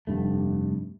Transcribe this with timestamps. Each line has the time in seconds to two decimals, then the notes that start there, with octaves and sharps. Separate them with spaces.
0.07 F1 G2 A3